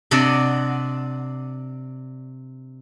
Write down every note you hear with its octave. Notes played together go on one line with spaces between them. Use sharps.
C3 D4 D5 D#5 F#5